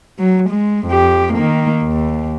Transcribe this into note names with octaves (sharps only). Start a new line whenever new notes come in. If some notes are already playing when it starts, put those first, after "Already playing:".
F#3
G#3
F2 G4
D#3 A#3
D#2